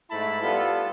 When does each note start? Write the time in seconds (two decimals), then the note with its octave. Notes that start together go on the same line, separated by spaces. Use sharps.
0.10 G#2 A3 E4 A5 B5
0.42 G3 B3 F4 A4